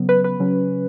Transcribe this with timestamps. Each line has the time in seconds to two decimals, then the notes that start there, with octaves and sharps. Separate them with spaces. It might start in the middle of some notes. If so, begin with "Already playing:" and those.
Already playing: C#3 F#3 B3
0.09 B4
0.24 B4
0.40 C#3 F#3 C#4